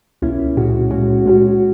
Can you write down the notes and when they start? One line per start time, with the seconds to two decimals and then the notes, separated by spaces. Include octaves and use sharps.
0.22 C#2 B2 A#3 C#4 E4
0.57 A#2 G#3 C#4 F#4
0.91 A#2 G#3 C#4 F#4
1.25 A#2 G#3 C#4 F#4